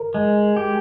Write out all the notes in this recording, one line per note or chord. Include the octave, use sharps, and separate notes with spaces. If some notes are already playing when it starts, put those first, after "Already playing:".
Already playing: A#4
G#3
G4